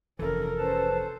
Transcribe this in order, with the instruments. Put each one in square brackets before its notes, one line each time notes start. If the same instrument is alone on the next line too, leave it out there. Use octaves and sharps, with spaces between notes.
[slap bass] F1 E3 [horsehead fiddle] C#4 A#4 [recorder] A4
[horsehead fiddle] C#4 C5 [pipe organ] B4 A5